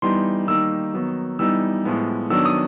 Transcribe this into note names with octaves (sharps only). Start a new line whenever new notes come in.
E3 G3 B3 D#4 C6
D#3 G3 A#3 D#4 E6
D#3 F#3 B3 D#4
E3 G3 B3 D#4 E6
A2 F3 G#3 B3
D#3 F#3 B3 D4 E6
D#6